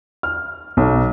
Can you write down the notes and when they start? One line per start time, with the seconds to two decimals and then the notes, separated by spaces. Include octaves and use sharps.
0.23 F6
0.77 B1